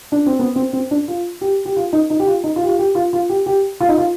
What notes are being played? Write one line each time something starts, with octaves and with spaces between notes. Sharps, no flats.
D4
C4
B3
C4
C4
D4
F4
G4
G4
F4
D#4
D#4
G4
F4
D#4
F4
G4
F4
G4
F4
F4
G4
G4
F4
D#4
F4